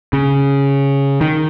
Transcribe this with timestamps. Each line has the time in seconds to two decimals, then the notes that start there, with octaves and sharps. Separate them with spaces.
0.13 C#3
1.21 D#3